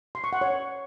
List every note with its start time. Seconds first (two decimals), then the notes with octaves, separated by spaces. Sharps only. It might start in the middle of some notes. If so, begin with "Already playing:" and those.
0.15 C6
0.24 C#6
0.33 F#5
0.41 C#5